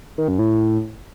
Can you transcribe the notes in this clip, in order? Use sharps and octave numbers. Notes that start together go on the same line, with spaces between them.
D#3
F#2
A2